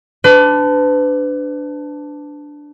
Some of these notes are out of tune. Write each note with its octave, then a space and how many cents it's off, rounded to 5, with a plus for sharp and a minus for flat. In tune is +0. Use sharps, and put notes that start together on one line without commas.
D4 +0 B4 +35